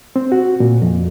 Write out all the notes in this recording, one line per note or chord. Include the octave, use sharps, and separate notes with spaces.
C4
F#4
A#2
F2